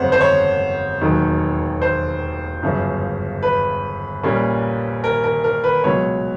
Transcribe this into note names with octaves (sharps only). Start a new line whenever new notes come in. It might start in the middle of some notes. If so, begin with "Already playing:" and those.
Already playing: G1 F2 C#3 F#3 A3 C5 C#5 F#5
C5
C#5
E1 D#2 D#3 F#3
C5
G1 F#2 C#3 F3
B4
A#1 A#2 G3 A#3 C#4
A#4
A#4
A#4
B4
C#2 B2 F#3 C#5